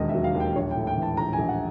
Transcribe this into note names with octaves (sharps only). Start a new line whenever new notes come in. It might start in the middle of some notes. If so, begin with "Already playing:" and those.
Already playing: E1 D#2 D#3 D#5
F#3 E5
F5
D#2
G5
A#1 C#5
G5
A2
G5
E3 A5
A#1 A#5
G#5
A#1
F#5